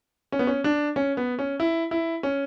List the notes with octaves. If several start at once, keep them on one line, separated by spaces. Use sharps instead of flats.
C#4
B3
C#4
D4
C#4
B3
C#4
E4
E4
C#4